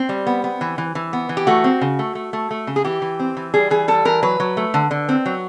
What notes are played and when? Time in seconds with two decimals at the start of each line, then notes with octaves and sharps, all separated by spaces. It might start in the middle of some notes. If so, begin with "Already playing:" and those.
Already playing: C4
0.09 G3
0.27 B3
0.44 B3
0.61 E3
0.78 E3
0.95 E3
1.13 B3
1.29 E3
1.37 G4
1.47 A3 F#4
1.64 C4
1.81 C#3
1.99 A3
2.15 A3
2.33 A3
2.51 A3
2.67 C#3
2.76 G#4
2.85 E3 G4
3.02 E3
3.20 C4
3.37 E3
3.54 G3 G#4
3.70 E3 G#4
3.88 G3 A4
4.05 E3 A#4
4.23 F#3 B4
4.40 F#3
4.57 A3
4.74 D3
4.91 D3
5.09 C4
5.26 F#3